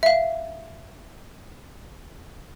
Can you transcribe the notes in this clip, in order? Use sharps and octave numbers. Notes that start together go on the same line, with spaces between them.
E5 F5